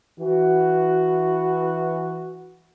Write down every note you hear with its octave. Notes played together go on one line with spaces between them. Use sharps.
E3 F#4